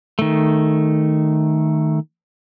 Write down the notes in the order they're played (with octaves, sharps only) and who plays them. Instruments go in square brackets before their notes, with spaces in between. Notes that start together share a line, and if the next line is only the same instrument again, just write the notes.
[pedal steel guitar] D#3 A3